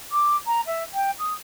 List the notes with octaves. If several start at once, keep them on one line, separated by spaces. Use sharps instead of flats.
D6
A#5
E5
G5
D#6